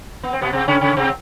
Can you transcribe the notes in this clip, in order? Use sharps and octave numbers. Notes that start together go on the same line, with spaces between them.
B3
C4
B2 B3
C3 C4
C#3 C#4
C#3 C#4
C3 C4